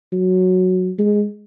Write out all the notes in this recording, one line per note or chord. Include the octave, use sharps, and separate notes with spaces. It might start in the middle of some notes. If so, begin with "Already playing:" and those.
F#3
G#3